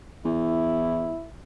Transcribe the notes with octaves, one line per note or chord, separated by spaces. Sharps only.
E2 E4